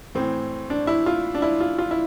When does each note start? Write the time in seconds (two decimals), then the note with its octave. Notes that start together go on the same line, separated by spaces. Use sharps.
0.15 A2 E3 C4
0.70 D4
0.87 E4
1.06 F4
1.35 D4
1.42 E4
1.60 F4
1.78 F4
1.91 E4